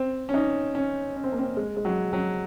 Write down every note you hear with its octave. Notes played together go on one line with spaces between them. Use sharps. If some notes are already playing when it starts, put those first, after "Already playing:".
Already playing: C4
C#4
D#4
C#4
C#4
C4
A#3
C4
G#3
G#3
F#3
F#3